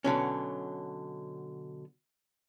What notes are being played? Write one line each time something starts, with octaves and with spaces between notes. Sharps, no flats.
B2 D3 F#3 C#4